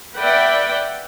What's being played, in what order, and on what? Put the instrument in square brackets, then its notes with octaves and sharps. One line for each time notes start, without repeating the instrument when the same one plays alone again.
[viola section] B4 D5 E5 F#5 G5